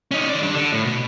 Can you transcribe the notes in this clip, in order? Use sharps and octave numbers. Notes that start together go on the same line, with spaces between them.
C#4 D#4
D#3 D5
G3 D4
D3
A2
B2